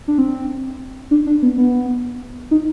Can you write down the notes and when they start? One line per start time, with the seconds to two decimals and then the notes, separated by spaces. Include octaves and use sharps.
0.08 D4
0.18 C4
1.11 D4
1.27 D4
1.42 B3
1.58 B3
2.51 D#4